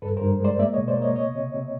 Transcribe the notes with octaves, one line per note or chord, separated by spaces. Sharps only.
G2 A4 B4
A#4 C5
G2
G#3 C5 D5
A#3 D5 E5
C#5 D#5
B2
C5 D5
A#3
C#5 D#5
C3 C#5 D#5
C3
C3